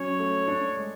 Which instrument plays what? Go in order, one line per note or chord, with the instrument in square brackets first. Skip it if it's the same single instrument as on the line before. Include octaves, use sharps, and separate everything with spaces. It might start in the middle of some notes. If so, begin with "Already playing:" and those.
Already playing: [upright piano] F#3 C#4 [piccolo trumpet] C#5
[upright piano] A3
D4
G#3